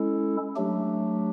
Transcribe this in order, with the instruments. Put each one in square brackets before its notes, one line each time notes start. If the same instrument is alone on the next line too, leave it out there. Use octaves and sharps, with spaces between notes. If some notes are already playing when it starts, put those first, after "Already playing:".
Already playing: [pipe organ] G#3 C#4 E4 A4
F#3 A3 D4 G4